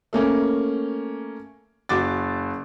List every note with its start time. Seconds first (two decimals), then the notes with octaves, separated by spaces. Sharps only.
0.13 A3 A#3 C#4
1.89 F#1 F#4 D6 A6